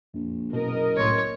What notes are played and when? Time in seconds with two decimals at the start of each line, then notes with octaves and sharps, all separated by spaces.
0.14 A#1 F2
0.53 F#1 B2 A#4 D#5
0.97 C2 A2 C#5 C6